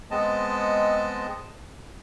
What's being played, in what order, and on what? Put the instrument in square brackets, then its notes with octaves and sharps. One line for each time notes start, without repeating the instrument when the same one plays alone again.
[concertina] G#3 B3 C4 D#5 A5